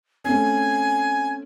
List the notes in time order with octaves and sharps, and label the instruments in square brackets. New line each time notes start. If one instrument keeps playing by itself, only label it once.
[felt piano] A3 C4 C#4 [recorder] G#5